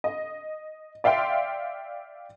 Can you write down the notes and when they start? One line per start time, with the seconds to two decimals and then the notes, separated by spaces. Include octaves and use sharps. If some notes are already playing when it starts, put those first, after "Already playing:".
0.04 D#5
1.04 D5 E5 F5 G5 C6